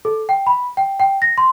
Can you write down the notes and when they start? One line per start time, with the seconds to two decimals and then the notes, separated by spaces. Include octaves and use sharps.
0.05 A4
0.29 G5
0.47 B5
0.77 G5
1.00 G5
1.22 A#6
1.38 C6